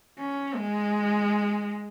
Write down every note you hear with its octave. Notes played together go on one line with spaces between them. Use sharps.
C#4
G#3